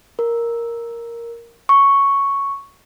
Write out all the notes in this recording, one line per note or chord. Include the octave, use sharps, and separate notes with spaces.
A#4
C#6